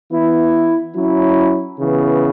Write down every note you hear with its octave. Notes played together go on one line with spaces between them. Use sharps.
E3 B3 E4
F#3 C#4 E4
C#3 E3 B3